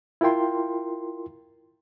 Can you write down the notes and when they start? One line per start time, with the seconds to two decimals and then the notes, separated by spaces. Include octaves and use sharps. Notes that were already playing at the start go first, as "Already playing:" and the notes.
0.21 E4 F4 A#4 G5 C6